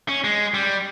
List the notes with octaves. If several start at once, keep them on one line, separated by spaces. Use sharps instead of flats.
C#4
G#3
G3